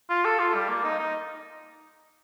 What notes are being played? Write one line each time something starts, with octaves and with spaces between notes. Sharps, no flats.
F4
A4
F4
G3
A#3
D#4
D#4